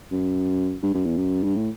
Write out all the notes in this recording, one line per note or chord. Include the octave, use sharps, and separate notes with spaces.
F#2
G2
F#2
E2
F#2
G2
A2